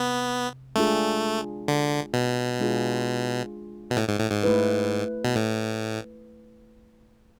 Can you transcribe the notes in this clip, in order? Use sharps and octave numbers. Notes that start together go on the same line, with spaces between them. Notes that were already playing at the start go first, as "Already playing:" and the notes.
Already playing: C3 B3
G#3 A3 D4 F4 G#4
D3
B2
G#3 D4 F4 G#4
B2
A2
G#2
A2
G#2
A3 E4 B4
B2
A2